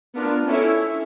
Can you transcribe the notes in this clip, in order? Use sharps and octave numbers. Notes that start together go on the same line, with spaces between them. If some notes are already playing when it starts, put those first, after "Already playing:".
B3 D4 F4 A#4
C#4 E4 A4 C#5 E5